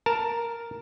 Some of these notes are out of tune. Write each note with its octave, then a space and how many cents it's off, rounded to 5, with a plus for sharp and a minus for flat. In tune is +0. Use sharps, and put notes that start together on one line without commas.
A#4 +0 A5 +10